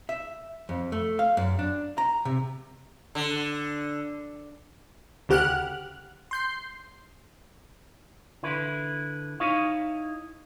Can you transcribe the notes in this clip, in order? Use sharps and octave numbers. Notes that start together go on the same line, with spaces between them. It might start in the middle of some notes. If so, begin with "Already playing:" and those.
E5
F2
A3
F5
F#2
D4
A#5
C3
D3
D2 C#3 G4 F#5 F6 F#6
C6 G6 C7
D3 E4 B4
D#4 E4 C#5 D#5 F5